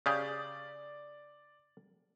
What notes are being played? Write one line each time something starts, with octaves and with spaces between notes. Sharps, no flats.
C#3 G4 G#4 D5